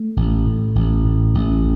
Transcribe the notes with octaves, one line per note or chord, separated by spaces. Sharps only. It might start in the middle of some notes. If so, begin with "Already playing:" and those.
Already playing: A3
A1
A2
A1
A2
A1